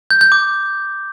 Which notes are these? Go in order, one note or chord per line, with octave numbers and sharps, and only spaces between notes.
G6
G6
D6